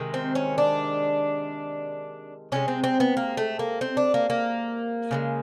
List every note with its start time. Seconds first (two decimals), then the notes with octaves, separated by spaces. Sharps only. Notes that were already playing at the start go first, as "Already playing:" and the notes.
Already playing: C3 D#3 G#3
0.14 C4
0.35 C#4
0.58 D4
2.52 C3 F3 G#3 C#4
2.68 C4
2.84 C4
3.00 B3
3.17 A#3
3.37 A3
3.59 A#3
3.81 C4
3.97 D4
4.14 A#3
4.30 A#3
5.11 C#3 F3 G#3